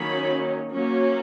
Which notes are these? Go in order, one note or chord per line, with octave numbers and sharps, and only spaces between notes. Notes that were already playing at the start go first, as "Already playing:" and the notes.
Already playing: D#3 F#3 A#3 C#4 B5
F#3 A#3 C#4